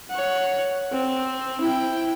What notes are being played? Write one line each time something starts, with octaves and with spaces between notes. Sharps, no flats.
C#5 F#5
C4
E4 G5